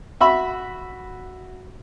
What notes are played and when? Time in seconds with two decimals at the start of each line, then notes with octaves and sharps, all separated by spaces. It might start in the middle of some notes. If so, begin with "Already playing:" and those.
0.21 F#4 E5 B5